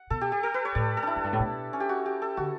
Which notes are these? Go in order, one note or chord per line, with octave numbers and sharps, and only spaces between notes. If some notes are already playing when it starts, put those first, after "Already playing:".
Already playing: F#5
B2 A4
G4
G4
A4
B4
C#5
A2 D5
A4
D4 E4
F#2
G2
A2
B2
C#4
G4
F#4
G4
A4
D3 F#4